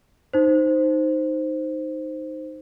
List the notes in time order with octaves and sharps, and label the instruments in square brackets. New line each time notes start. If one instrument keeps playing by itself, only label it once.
[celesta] D#4 C5